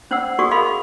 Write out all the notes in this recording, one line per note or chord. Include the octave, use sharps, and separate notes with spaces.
C#4 C5 D5 F#5 E6
F#4 G#4 A4 D5 C#6 D#6
G#4 A#4 D#5 F5 B5 C6